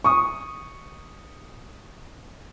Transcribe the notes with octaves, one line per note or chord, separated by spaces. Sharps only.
C#6 D#6